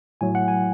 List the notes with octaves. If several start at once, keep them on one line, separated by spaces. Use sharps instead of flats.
A2 F#3 G#5
F#5
G#5